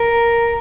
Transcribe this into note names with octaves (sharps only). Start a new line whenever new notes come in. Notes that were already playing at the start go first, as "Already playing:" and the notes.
Already playing: A#4